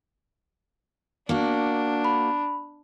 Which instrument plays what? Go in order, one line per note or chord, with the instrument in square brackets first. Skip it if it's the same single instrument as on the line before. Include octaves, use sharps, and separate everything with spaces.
[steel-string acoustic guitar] A#3 F#4 [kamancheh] D4
[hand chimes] B5